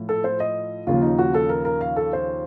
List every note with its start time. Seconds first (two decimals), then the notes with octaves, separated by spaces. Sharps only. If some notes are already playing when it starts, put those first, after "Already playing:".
Already playing: A2 F3
0.09 A4
0.24 C5
0.40 D#5
0.87 D#2 C#3 F3 F4
1.02 D#4
1.18 F#4
1.34 A4
1.49 A#4
1.65 A#4
1.81 F5
1.96 A4
2.13 C5